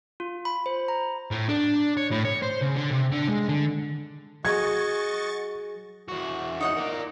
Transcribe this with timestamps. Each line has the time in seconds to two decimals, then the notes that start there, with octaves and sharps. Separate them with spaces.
0.20 F4
0.45 B5
0.66 C5
0.88 A#5
1.31 A2
1.49 D4
1.97 C#5
2.11 A2
2.25 C#5
2.43 C5
2.62 C#3
2.75 D3
2.92 C3
3.12 D3
3.30 G#3
3.49 D3
4.45 F#3 F#4 G#4 D#5 C#6 G#6 A6
6.08 E2 F#4
6.60 D#4 C#5 F#5
6.77 A#4 D5